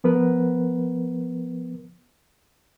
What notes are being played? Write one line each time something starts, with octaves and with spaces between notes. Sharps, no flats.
F3 B3 A#4 B4